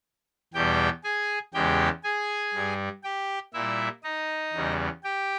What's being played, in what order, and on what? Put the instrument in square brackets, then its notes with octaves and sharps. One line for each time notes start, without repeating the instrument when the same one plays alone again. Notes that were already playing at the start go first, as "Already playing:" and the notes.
[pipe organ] E2 B2 G3 G4 G5
G#4 G#5
E2 C#3 G#3 G4 G5
G#4 G#5
G2 G3
G4 G5
A#2 G3 E4 E5
D#4 D#5
E2 C#3 G3
G4 G5